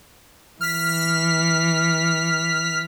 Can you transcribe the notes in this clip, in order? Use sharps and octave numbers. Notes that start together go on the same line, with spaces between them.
E3 F6 B6